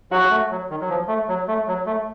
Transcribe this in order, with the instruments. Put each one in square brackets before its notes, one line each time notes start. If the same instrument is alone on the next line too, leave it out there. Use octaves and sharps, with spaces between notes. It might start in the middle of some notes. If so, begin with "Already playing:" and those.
[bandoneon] F#3 [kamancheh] F#4
[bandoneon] A3
F#3
D#3
F#3
F3
A3
F#3
A3
F#3
A3